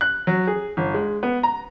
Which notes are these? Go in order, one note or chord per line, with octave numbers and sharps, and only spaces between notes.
F#6
F#3
G#4
G1
G#3
B3
A#5